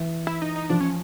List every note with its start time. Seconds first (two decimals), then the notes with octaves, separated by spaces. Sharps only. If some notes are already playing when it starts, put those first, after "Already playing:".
Already playing: E3
0.27 E4
0.42 D#4
0.56 D#4
0.70 F3 D4
0.80 C#4